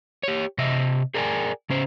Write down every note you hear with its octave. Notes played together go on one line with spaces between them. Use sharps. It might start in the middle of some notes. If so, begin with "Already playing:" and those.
G4 C#5
C3 D#5 E5
G#4 A#4 D5 E5 G5 G#5
C#3 C#4 C5